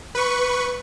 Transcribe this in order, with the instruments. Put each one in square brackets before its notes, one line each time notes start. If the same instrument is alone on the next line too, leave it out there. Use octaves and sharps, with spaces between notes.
[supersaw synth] B4 C#6